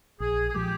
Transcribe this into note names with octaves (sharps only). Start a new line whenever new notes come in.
A#1 G#4
G#4
A#2 F3 G#3 G4